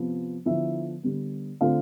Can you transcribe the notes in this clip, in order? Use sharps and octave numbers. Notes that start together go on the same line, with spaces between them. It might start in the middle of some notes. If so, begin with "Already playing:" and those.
Already playing: C3 F3 B3
D3 F3 B3 E4 E5
D3 G3 B3
D3 A3 C4 F4 F5